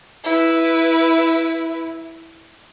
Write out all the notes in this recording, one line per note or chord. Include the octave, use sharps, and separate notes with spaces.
E4 B4